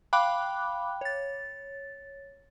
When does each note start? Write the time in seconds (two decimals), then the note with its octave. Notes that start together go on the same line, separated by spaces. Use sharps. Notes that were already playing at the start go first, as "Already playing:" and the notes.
0.13 F5 G5 B5 D6 F#6
1.01 C#5 A6